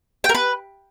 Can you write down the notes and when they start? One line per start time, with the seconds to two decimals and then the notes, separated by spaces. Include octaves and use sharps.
0.24 G5
0.29 A#4
0.35 B4